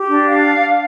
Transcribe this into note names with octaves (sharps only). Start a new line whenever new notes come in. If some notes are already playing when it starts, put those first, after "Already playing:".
Already playing: G4
D4
F5